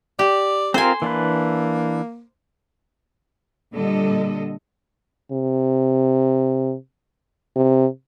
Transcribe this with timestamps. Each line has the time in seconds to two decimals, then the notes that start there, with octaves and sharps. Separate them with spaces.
0.19 G4 D5
0.74 C4 F4 A#4 C5 G#5
1.02 E3 A#3 D4 B4
3.73 A#2 D3 G3 A4 D#5
5.32 C3
7.56 C3